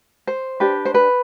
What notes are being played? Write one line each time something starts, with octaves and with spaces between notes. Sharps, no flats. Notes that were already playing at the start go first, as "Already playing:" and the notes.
C5
D4 G4 B4
C5
B4